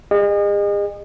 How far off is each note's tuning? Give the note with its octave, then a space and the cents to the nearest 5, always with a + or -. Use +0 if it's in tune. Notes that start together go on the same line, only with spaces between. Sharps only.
G#4 -40 D#5 -35